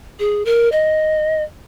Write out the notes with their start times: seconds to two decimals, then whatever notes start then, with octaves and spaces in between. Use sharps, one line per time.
0.19 G#4
0.45 A#4
0.72 D#5